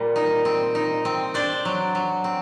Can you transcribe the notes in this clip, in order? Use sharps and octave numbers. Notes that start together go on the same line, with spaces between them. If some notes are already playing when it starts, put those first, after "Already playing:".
Already playing: A#2 G3
D#4
C4
D#4
C4
D4 C5 D5
F#3
F#3
C4